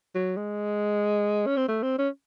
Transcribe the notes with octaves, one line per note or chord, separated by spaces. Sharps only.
F#3
G#3
C#4
C4
A3
C4
C#4